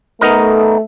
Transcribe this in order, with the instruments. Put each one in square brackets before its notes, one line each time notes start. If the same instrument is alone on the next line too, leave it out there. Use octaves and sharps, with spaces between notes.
[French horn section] A3 [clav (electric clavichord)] B3 D#4 A#4